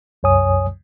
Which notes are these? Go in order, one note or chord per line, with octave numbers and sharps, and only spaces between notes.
C2 F#2 C#5 G#5 D#6